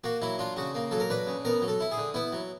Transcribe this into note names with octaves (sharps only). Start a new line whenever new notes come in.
A#3 F#4
F#3 E4
D4 F4
C#3 F#4
A#3
F#3 A4
A#4
D4 B4
C#3
B3 A#4
F#3
A4
E4
G#4
D3
B3 E4
F#3